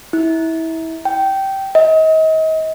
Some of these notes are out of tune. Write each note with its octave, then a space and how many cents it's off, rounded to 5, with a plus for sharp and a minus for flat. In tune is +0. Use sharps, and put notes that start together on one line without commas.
E4 -25
G5 -15
D#5 +35